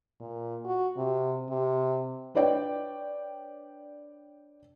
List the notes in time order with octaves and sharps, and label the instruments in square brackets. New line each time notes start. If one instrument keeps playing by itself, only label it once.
[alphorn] A#2
F#4
C3
C3
[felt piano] D4 B4 C#5 D5 G5